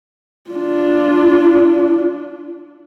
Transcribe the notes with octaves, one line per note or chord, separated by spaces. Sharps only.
D4 F4